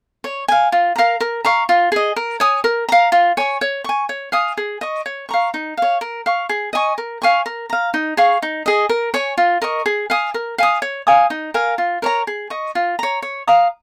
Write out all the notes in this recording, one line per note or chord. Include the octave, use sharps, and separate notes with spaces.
C#5
F5 G#5
F4
A#4 F5 A#5
A#4
F5 A#5 C#6
F4
G#4 D#5
A#4
C#5 G#5 D#6
A#4
F5 A#5
F4
C#5 G#5 C#6
C#5
G#5 C#6
C#5
F5 G#5 D#6
G#4
D#5 C#6
C#5
F5 A#5 C#6
D#4
C#5 F5
A#4
F5 C#6
G#4
D#5 G#5 C#6
A#4
F5 G#5 C#6
A#4
F5 A#5
D#4
G#4 F5 C#6
D#4
G#4 D#5
A#4
C#5 G#5 C#6
F4
A#4 D#5 C#6
G#4
F5 G#5 D#6
A#4
F5 G#5 D#6
C#5
F5 G#5 D#6
D#4
A#4 F5 G#5
F4
A#4 C#5 A#5
G#4
D#5 C#6
F4
C#5 A#5
C#5
F5 A#5 D#6